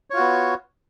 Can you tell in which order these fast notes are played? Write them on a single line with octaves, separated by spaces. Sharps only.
C#5 F4 F#4 B3